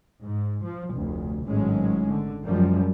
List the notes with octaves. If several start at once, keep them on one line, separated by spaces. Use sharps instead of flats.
G#2
F3
F1 D2
G#1 A2 F#3 G#3 C#4
D3
F#2 F3 G3 G#3